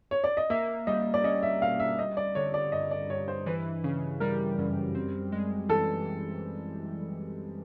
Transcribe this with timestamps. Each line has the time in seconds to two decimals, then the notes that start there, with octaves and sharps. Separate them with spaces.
0.11 C#5
0.24 D5
0.37 D#5
0.50 A#3 E5
0.87 G3 D#5
1.14 D5
1.24 C#4 D#5
1.43 E5
1.61 B2 F5
1.80 E5
1.99 G3 D#5
2.17 D5
2.35 D3 C#5
2.54 D5
2.72 G2 D#5
2.91 D5
3.10 G2 C#5
3.28 C5
3.46 E3 B4
3.84 C#3
4.20 G3 A#4
4.59 F#2
4.95 C4
5.32 G#3
5.69 E3 A4